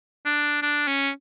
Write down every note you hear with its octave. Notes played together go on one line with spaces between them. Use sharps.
D4
D4
C#4